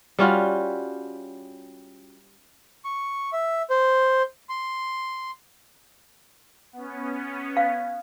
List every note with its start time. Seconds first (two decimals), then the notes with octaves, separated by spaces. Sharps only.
0.19 G3 C#4 F4 F#4
2.85 C#6
3.33 E5
3.70 C5
4.49 C6
6.73 B3 C#4
7.57 F5